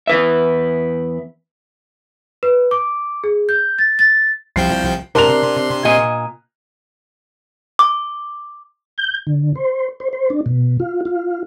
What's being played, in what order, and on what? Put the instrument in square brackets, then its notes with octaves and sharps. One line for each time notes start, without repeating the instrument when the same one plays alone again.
[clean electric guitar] E2 B4 E5
[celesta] B4
D6
G#4
G6
A6
A6
[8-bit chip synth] C2 F3 G5 [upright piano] C7
[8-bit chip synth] C3 C6 [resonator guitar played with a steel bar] D4 [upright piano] A#4 F7
[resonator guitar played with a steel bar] A#2 D#5 G#5
[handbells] D6
[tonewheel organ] G6
D3
C5
C5
C5
D4
B2
F4
F4